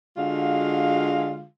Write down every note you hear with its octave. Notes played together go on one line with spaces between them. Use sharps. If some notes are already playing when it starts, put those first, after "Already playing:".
D3 G#3 F4 F#4 F5